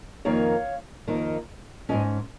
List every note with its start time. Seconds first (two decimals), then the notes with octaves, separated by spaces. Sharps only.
0.25 F2 D#3 A#3 D#4 C#5 F5
1.07 F2 D#3 A#3 D#4
1.89 G#2 D#3 C#4 D#5 G#5